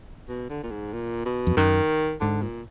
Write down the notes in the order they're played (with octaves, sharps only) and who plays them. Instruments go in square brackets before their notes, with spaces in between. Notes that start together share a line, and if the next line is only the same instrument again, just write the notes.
[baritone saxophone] B2
D3
A#2
G#2
A#2
B2
[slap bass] F2
[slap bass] F#2 [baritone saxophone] D#3
[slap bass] G#2 [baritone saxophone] D3
[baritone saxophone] A#2